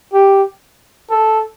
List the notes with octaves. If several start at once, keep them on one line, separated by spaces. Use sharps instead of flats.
G4
A4